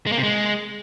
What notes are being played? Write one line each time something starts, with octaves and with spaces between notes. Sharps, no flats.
G#3
A#3
C3
G#3